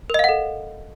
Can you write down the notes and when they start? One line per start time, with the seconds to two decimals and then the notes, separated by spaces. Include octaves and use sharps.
0.10 A#4
0.14 D#5
0.19 F5
0.24 F#5
0.29 A4